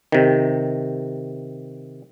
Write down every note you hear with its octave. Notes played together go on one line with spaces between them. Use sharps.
C3 D#3